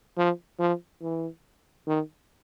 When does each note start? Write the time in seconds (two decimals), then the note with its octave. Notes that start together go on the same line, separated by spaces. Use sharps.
0.17 F3
0.59 F3
1.02 E3
1.87 D#3